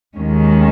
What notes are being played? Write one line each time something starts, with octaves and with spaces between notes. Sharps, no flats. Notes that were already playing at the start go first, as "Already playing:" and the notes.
D#2 D#3 G#3 C#4